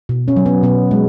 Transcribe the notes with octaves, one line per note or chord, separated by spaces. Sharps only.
B2
C#4
F#3
B3
B2 B3
G#3